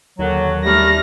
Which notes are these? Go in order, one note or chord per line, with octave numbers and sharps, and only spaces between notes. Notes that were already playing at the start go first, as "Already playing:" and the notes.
D#2 D3 D#3 F#3
G3 A3 F6 A#6